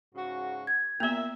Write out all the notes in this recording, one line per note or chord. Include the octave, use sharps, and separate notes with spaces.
G#2 C#3 F#4
G#6
A#2 A#3 B3 A#4 E5